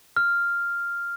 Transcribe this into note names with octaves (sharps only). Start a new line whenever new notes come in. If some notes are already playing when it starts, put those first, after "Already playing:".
F6